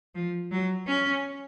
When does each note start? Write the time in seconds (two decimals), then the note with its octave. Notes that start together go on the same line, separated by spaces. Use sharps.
0.15 F3
0.51 F#3
0.87 C#4